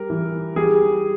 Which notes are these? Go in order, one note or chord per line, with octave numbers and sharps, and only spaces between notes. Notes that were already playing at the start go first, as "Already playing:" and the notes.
Already playing: G3 A#4
E3
G3 G#4